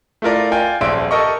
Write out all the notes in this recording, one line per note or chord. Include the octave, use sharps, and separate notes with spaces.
A3 E4 F4 A#4 D5
F4 D5 G5 G#5
D#1 A#1 E5 C6 D7
G4 A4 A#4 D#5 C#6